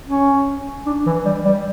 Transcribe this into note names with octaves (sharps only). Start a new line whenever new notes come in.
C#4
D4
E3
G3
G3